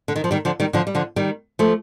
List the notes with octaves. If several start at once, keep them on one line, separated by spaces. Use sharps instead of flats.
D3
D#3
F3
D#3 G3
D3 F3
D#3 G3
D3 F3
G3
D3 F3
D#3 G3
F3 A3